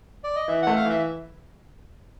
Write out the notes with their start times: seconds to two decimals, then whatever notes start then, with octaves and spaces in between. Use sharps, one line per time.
0.24 D5
0.36 D#5
0.48 E3 E5
0.62 A3 F#5
0.76 F5
0.85 E3 E5